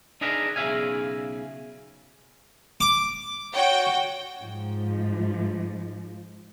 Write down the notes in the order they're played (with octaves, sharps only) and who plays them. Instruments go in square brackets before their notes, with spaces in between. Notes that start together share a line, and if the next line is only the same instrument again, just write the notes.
[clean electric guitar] D4 D#4 G#4 A#4 B4 E5
B1 C#3 G#4 E5 F5 G#5
[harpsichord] D6
[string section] F#4 G5 [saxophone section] C#5
[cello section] G#2 F3